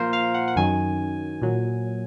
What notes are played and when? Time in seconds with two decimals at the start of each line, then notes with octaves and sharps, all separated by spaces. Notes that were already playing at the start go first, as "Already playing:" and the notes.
Already playing: A#2 F3 F4 A#4 C5
0.13 F5
0.34 F#5
0.48 F#5
0.56 F#2 D#3 F#3 G#5
1.42 A#2 F#3